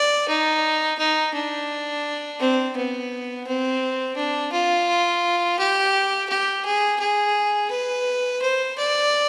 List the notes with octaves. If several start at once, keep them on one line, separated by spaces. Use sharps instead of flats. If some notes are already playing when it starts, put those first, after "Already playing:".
Already playing: D5
D#4
D#4
D4
C4
B3
C4
D4
F4
G4
G4
G#4
G#4
B4
C5
D5